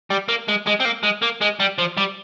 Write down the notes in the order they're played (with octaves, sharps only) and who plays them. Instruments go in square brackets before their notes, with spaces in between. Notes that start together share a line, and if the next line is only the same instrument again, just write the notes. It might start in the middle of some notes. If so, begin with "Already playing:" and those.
[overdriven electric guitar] G3
A#3
G#3
G#3
C4
A#3
G#3
A#3
G#3
G3
F3
G3